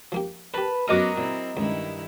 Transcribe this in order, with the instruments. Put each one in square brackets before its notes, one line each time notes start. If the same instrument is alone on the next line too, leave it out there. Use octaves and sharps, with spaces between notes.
[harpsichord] F3 A#3 G4
[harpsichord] G4 A#4 [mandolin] B4 A5 B5
[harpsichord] F#2 D#6 [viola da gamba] F#3 B3 F#4 [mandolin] A#4 D#5 D6
[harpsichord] A#2 [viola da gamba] C4 E4
[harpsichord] C#2 [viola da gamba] G2 D#3 E4